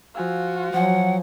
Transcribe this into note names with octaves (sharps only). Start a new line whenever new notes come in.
F3 F4 F#4 G#5 E6
F3 F#3 F#5 G#5